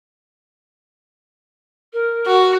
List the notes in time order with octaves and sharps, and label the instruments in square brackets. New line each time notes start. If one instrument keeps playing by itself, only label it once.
[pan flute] A#4
[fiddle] F#4